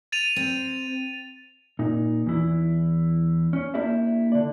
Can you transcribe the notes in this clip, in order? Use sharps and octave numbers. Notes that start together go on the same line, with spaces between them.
A6 D#7 F7
C4
A#2 D#4
E2 E4
C#4
A#3 D4 E4 G4 D5 E5
D3 D5